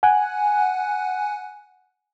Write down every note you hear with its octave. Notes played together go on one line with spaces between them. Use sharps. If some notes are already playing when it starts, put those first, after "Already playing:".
F#5 G#5 F#6